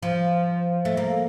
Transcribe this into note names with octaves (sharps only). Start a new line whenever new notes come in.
F3
A3
A#3